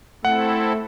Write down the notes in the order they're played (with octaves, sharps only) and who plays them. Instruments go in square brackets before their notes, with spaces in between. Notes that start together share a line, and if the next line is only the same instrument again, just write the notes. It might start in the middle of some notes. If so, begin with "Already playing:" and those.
[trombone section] A3 [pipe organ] C4 E4 A4 [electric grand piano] F#5